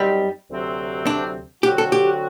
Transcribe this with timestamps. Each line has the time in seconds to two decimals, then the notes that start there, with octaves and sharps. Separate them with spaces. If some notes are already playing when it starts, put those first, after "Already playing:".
Already playing: F#2 F#3 G3 C4 D#4
0.50 D2 C3 F#3 C4
1.07 D4
1.63 D3 F#3 C4 F#4 G4
1.78 A4
1.92 G4